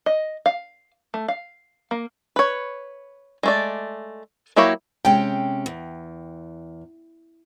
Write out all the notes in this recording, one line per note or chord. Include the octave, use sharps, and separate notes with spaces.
D#5
F5
A3
F5
A#3
B4 C#5
G#3 A3 D5
F#3 A#3 E4 G4 C#5
C3 G#3 C#4 G5
E2